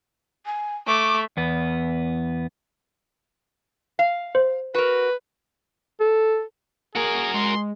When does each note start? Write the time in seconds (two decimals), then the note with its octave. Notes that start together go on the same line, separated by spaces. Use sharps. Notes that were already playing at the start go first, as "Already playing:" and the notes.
0.46 G#5
0.87 A3 C#6 D6
1.37 E2 B3
3.99 F5
4.35 C5
4.74 F#4 A#4 B4
6.00 A4
6.95 A#3 F#4 G#4 A#4
7.34 G#3 C6